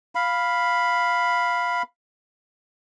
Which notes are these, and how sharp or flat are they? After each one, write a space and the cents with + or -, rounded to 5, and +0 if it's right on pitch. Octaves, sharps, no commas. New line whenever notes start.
F5 +0 B5 +0